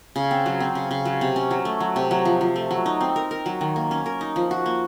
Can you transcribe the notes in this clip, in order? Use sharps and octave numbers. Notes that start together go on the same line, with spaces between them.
C#3
C4
F#3
C4
C#3
C#3
F#3
C3
C#4
F#3
A3
F#3
C3
F#3
F3
F3
A3
F#3
D#4
C4
A#4
A#4
F#3
D#3
A#3
C#4
A#4
D#4
F3
F#4
A#3